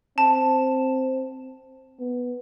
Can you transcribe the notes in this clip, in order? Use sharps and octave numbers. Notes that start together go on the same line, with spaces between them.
C4 A5
B3